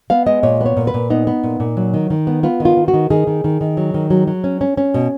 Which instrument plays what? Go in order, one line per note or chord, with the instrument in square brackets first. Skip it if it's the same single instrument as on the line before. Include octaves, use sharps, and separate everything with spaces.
[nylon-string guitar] B3 F5
G#3 D#5
A#2 C#5
B3
C#5
A#2
B4
A#2
B3 D#4
B3
A#2
A#2
F#3
D#3
D#3
B3
B3 F4
D#3
F4
D#3
F#4
D#3
D#3 G#4
D#3
D#3
D#3
F#3
D#3
F#3
F#3
C#4
C#4
C#4
B2